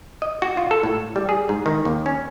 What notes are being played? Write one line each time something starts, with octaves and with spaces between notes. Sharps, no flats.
D#5
F#4
F4
A4
A2
G3
G#4
G#2
D#3
D#2
C#4